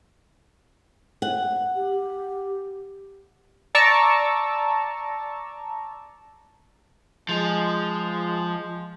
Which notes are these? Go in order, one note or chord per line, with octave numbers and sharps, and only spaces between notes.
F#5
G4
D5 A5 A#5 C#6 D6 E6
F3 G#3